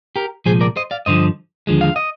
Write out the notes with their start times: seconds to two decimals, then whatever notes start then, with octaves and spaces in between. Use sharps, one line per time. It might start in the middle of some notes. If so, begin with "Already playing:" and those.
0.16 G4 A#4
0.46 C2 A#2 F3 G#3 G#4 C5
0.61 A#4 D5
0.76 C5 D#5
0.91 D5 F5
1.06 G2 D3 F3 C5 D#5
1.67 D#2 D3 F3 G#3
1.81 F5
1.96 D#5